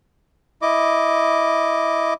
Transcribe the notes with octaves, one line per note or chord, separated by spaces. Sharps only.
E4 D#5 D6